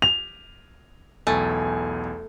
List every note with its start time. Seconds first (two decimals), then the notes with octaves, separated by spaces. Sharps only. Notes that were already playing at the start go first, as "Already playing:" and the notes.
0.02 F7
1.27 B1 E2 A3 G#5